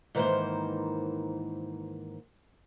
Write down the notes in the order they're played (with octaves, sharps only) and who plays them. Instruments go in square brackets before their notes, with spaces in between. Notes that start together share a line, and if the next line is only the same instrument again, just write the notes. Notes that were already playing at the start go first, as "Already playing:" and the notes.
[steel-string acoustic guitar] G#2 D#3 E3 F#3 A#3 C5